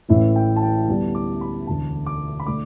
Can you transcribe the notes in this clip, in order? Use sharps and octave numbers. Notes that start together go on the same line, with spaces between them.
A1 A2 E3 E5
G5
A5
G5
D2 D3 G3 B3 D4 A5
D6
B5
E1 D2 D3 A5
D6
B5
D3 A3 D4 D6